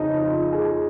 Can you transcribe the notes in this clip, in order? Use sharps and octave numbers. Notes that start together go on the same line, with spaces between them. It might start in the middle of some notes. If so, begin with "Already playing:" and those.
Already playing: F2 C#3 F3 D#4
F4
G#4